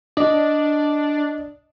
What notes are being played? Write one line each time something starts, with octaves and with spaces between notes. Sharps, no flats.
D4 D5 D#5